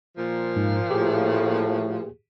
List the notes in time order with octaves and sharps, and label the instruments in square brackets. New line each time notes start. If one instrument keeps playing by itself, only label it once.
[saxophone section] A#2 F3
[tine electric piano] G#2
[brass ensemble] A2 A3 [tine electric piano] G4 G#4